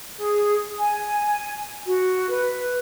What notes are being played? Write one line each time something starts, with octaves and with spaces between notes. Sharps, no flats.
G#4
G#5
F#4
B4